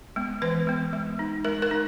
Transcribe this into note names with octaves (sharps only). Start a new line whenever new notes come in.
G#3 B3
E3 B4
G#3 B3
G#3
D#4
G#3 A#4
A#4
D#4